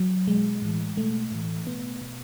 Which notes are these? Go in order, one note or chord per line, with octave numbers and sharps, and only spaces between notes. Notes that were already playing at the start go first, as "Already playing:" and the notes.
Already playing: F#3
B2 G#3
A2 E3
B2 A3
A2 E3
B2 B3
B2